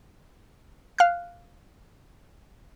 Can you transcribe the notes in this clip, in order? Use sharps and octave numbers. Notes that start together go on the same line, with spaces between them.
F5 F6 F#6